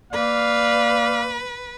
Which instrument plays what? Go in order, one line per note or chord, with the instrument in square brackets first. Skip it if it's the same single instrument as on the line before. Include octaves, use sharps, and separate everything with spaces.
[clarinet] A#3 [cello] B4 [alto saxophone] D5 [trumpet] F5